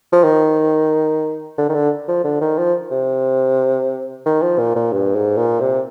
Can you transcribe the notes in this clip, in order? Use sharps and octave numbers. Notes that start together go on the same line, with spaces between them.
F3
D#3
D3
D#3
D3
F3
D3
D#3
F3
C3
D#3
F3
A#2
A#2
G2
G#2
A#2
C3